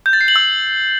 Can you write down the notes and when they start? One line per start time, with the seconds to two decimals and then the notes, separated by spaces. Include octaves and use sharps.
0.06 G6
0.13 A6
0.21 C7
0.28 F#7
0.36 E6